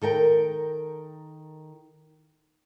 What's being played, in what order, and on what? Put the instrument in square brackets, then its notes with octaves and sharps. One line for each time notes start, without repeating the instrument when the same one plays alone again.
[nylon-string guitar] D#3 A4 A#4 G5